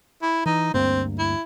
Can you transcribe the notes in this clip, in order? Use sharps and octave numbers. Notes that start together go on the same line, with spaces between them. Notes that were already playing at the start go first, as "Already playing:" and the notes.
E4
E3 D#4
D2 G2 A#3 C4
E4